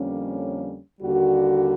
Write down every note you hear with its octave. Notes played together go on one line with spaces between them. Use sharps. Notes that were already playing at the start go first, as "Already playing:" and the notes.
Already playing: F2 D3 G3 A#3 C#4
D#2 D3 G3 A#3 F#4